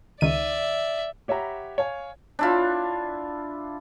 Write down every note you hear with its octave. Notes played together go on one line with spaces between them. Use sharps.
C#2 D#3 D5 E5 D#7
G4 C#5 E5 F#5 A#5 B5
C#5 F5 G#5
D4 E4 F4